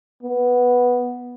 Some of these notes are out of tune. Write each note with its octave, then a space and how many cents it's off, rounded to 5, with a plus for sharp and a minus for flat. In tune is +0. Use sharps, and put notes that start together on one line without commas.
B3 -5